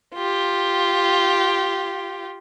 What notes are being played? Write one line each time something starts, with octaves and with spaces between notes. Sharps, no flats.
F4 G4